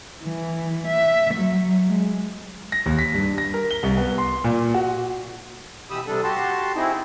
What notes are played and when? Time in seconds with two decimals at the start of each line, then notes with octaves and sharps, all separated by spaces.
0.24 E3
0.87 E5
1.34 F#3
1.88 G#3
2.72 A#6
2.86 D#2
2.99 B6
3.14 G2
3.38 A#6
3.54 A#4
3.71 G7
3.83 C2
3.97 B3
4.18 C6
4.44 A#2
4.74 F#4
5.90 B2 E3 G4 B5 D#6 E6
6.07 C3 G3 D4 A4
6.23 F#4 G4 A5 C6
6.76 C4 D#4 E4 G#4